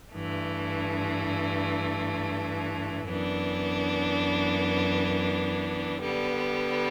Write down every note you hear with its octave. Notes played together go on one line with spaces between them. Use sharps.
G2 E3 A3
F#2 E3 B3 D4
D3 G3 B3